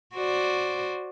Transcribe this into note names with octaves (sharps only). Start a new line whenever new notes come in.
F#4 C5 D5